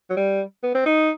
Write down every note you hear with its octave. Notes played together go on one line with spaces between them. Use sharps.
F#3
G3
B3
C4
D#4